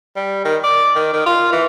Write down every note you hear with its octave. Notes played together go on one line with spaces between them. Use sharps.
G3
D#3
D5
D#3
D#3
F4
E3